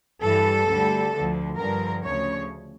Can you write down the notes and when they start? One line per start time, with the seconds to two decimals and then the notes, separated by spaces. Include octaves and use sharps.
0.21 G2 E3 G3 A4
0.67 D2 D3 G3
1.13 D2 D3 F3
1.58 G2 D3 F3 A#4
2.04 D2 C#3 F3 C#5